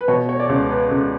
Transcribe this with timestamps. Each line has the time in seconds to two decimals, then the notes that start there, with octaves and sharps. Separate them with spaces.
0.01 B4
0.08 B2 C#5
0.29 C#5
0.40 D5
0.49 C#2 C#5
0.70 B4
0.91 C#2